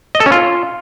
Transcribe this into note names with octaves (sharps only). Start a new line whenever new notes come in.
D#5
A4
C#4
F4